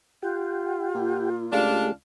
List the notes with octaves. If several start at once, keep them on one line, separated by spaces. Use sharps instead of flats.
F4 G4 F#5 G5
A#2
C#2 A3 D4 G4 G#4 F5